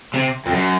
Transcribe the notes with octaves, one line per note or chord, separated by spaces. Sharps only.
C3
F2
F#2